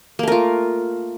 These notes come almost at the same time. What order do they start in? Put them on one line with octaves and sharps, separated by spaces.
A#3 A3 A#4 F4